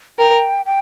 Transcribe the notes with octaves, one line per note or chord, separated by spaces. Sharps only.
A#4 G5
G5